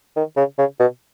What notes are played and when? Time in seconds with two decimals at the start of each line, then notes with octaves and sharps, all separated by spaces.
0.16 D#3
0.37 C#3
0.58 C#3
0.80 B2